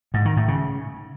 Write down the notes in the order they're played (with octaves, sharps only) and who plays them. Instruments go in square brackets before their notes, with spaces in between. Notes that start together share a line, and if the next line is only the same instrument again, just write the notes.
[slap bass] G#2
D#3
A2
C#3